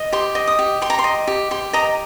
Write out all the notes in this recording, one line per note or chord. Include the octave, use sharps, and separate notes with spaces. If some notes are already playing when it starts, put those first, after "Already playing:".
Already playing: D#5
G4 C6
D#5
D#6
G4
G4 C6
A#5
C6
D#5
G4
G4 C6
D#5 A#5